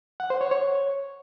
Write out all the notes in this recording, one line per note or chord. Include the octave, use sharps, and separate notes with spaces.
F#5
C5
C#5
C#5